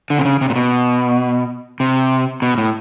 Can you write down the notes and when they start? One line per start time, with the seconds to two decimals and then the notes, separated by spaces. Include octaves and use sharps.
0.10 D3
0.18 C3
0.25 C#3
0.41 C3
0.50 A#2
0.56 B2
1.80 C3
2.42 B2
2.58 A2